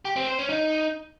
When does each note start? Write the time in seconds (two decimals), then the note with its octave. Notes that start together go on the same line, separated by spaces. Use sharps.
0.05 G4
0.16 C4
0.27 C5
0.38 C#4
0.50 D#4